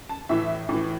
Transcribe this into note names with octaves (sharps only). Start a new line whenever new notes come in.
A5
A2 E3 E5
A2 E3